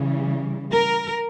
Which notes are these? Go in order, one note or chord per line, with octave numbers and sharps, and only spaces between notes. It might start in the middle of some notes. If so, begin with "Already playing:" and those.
Already playing: C#3 E3 G3
A#4